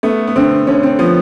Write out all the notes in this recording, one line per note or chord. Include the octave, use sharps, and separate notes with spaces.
A3 B3
B3
D3 C4
D3 C#4
C4
F3 B3